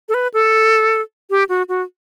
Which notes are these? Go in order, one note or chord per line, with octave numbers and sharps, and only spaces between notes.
A4
B4
A4
G4
F#4
F#4